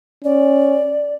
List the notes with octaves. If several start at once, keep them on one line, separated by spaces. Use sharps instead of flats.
C#4 D5